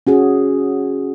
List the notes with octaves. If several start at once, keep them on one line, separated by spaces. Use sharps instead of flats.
C#4 F#4 G#4